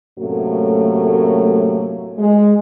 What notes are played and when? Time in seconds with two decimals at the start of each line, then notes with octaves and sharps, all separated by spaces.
0.19 F#2 A2 C3 F#3 A3 A#3
2.18 G#3